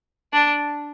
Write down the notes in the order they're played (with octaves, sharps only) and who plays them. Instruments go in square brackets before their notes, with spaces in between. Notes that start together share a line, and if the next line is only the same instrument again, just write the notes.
[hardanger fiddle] D4